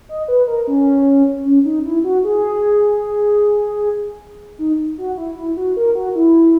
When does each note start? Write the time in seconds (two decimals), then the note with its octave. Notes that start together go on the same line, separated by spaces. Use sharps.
0.09 D#5
0.28 B4
0.47 A#4
0.67 C#4
1.45 C#4
1.65 D#4
1.85 E4
2.04 F#4
2.25 G#4
4.59 D#4
4.98 F#4
5.17 E4
5.37 E4
5.57 F#4
5.77 A#4
5.95 F#4
6.15 E4